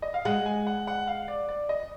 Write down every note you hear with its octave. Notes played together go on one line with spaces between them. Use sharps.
D#5
F5
G#3 F#5
G#5
F#5
F#5
F5
D5
D5
D#5